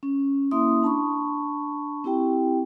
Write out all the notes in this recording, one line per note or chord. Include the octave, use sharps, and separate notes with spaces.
C#4
A#3 C#4 E4 E5 C6 D#6
D4 A5 B5 C#6
C4 E4 G4 G5